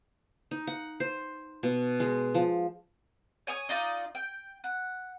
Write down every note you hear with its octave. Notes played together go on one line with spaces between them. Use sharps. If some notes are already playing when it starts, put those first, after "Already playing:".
D#4
F#5
C5
B2
G#3
F3
C#5 G#5 C#6 D#6
D#4 F4 D5 D#5
G5
F#5